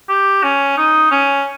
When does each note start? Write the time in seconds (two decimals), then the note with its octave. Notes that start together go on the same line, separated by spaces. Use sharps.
0.09 G4
0.44 C#4
0.78 D#4
1.11 C#4